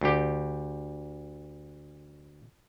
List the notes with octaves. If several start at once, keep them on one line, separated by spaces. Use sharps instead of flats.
D2 G4